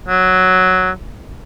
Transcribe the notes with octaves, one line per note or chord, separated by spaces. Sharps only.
F#3